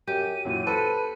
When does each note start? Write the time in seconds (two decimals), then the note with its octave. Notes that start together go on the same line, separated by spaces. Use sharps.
0.07 F#2 G4 D#7
0.45 F#2 A#2 E3 F#3
0.67 A4 B4 C5